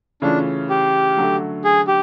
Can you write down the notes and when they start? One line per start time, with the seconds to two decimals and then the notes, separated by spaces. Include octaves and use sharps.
0.22 C#3 E3 A3 C#4 D4 F4
0.70 G4
1.17 D3 F#3 A3
1.64 G#4
1.88 G4